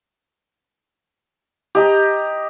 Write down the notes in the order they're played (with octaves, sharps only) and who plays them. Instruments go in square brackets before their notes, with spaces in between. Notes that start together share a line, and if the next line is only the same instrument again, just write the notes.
[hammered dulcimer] G4 D#5 A#5